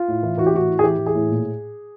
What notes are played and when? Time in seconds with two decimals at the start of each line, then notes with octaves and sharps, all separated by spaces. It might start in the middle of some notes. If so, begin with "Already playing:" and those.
Already playing: F4
0.08 A2
0.23 E3
0.38 E3 F#4
0.46 G4
0.53 A2 F#4
0.68 A2
0.79 G#4
0.83 E3 G4
0.98 E3
1.06 G#4
1.15 A2
1.29 A#2